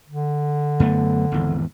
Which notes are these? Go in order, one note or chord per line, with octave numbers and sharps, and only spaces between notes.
D3
F#2 A3 B3
G#1 E2